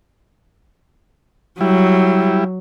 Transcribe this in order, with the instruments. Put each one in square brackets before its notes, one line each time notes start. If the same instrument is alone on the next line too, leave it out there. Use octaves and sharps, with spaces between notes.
[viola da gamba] F#3 [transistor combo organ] G3 E4